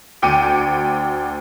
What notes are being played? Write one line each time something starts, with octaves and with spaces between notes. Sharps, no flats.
D2 G5 D6 C#7 D#7